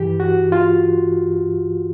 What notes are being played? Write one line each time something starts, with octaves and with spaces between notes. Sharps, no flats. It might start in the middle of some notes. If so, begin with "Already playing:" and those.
Already playing: G2 E3 G4
F#4
F4